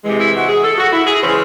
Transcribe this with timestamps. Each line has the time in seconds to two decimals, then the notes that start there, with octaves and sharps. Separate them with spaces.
0.04 C3 E3 G#3
0.19 E4
0.34 F#4
0.48 G#4
0.64 A4
0.78 F#4
0.92 E4
1.07 G#4
1.22 C#3 E3 G#3 C5